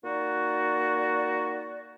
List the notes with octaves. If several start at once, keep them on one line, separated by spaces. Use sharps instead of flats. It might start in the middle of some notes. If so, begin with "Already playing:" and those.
A#3 D#4 F#4 D5